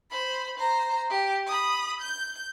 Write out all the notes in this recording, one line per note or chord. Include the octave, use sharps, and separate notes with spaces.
C5 B5
C5 A#5
G4
B5 D#6
G6